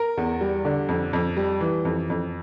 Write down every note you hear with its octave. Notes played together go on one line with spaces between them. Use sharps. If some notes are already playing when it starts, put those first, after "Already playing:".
Already playing: A#4
E2
G3
D3
F2
F2
G3
E3
F2
F2